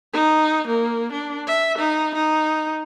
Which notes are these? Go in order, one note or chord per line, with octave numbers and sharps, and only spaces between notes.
D#4
A#3
D4
E5
D#4
D#4